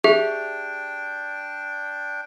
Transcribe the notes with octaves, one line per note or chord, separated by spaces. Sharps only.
D4 G4 G#4 E5 G5